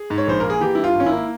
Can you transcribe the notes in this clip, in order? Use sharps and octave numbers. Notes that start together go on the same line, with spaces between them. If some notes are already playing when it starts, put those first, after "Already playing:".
Already playing: G#4
G#2
C#5
A#1 C5
A#3 A#4
G#4
E3 G4
G2 E4
F4
G#1 C#4
E4
A#3